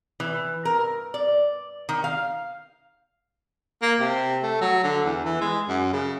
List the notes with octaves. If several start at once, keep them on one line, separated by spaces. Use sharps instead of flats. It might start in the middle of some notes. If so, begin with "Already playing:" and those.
E3
A#4
D5
D#3
F5
A#3
C3
A3
F#3
D3
E2
E3
G#3
F#2
C#3